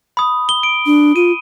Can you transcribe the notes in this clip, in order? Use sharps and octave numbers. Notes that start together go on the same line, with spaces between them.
B5 D#6
G7
D7
D4
F4 D#7